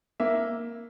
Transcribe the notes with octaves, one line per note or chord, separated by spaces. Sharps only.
A#3 E5